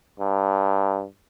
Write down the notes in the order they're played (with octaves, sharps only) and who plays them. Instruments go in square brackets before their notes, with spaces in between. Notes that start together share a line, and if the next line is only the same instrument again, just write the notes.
[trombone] G2